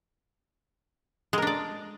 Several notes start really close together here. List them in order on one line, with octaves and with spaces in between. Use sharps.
G#3 A#4 D4 D5